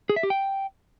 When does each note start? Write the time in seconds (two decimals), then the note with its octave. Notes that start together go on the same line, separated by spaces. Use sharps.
0.09 G#4
0.16 E5
0.23 G4
0.30 G5